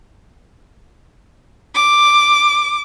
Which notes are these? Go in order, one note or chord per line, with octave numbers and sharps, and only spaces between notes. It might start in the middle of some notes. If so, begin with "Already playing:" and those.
D6